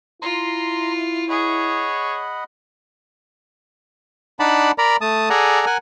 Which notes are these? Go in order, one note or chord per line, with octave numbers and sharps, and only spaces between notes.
E4 F4 A#5 C6
G#4 C#5 D#5 F#5 B5
D4 D#4 D5 F#5 A5 B5
A#4 D5 A#5 B5
A3 A5 D#6
G#4 A4 D5 F#5 G#5 A#5
A#4 F#5 G#5